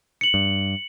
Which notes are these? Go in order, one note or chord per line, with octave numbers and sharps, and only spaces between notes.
C#7 F#7
G2